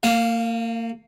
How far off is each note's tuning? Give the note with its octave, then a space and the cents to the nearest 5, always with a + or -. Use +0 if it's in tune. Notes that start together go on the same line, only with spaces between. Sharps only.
A#3 -35 F5 +0 A5 +20